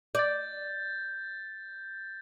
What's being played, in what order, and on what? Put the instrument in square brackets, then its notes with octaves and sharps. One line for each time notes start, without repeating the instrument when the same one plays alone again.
[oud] D5 [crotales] G6 A6